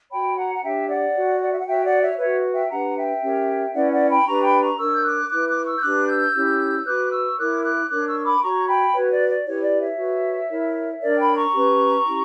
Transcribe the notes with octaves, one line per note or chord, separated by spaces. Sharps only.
F#4 C#5 G5 B5
F#5 A#5
F#5
D4 G4 C#5 E5 G5
D5 F#5
F#4 C#5
D5
E5
F#5
F#4 C#5 E5 G5
D5 F#5
C#5 E5
F#4 B4 C#5 E5
E5 G5
D4 G4 B4 F#5 A#5
E5 G5
C#4 G4 A#4 C#5
C#4 E4 B4 D5 F#5
D5 F#5
G5 B5
D4 G4 B4 A#5 C#6
G5 B5
A#5 C#6
D4 A#4 C#5 C#6 E6
G6
D6 F#6
E4 B4 D6 F#6
D6 F#6
C#6 E6
G6
D4 G4 B4 D6 F#6
E6 G6
C#4 E4 G4 C#5
F#4 B4 D6 F#6
C#6 E6
E4 A#4 C#5 D6 F#6
D6 F#6
D4 A#4 C#5 D6 F#6
C#6 E6
E6
B5 D6
F#4 C#5 A#5 C#6
G5 B5
F#4 B4 C#5
D5
D5
E4 G4 B4 C#5
D5
C#5 E5
F#4 B4
E4 A#4 C#5
D4 A#4 C#5 D5
G5 B5
A#5 C#6
C#4 G4 B4
C#4 E4 G4